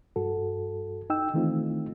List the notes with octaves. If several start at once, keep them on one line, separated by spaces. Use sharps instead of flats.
G2 F#4 A4
D#4 G5 E6
D#3 E3 A3 C4 D#4 F4